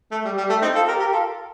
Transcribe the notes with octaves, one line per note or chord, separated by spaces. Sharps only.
A3
G3
G3
A3
C4 D#4
F4 A4
G4 A#4
G4 A#4
F4 A4